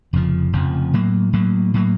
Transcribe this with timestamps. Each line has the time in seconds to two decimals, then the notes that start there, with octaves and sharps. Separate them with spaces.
0.13 F1 F2 C#3 F3
0.53 F1 F2 C#3 F3
0.94 A2 F#3 A#3
1.33 A2 F#3 A#3
1.74 A2 F#3 A#3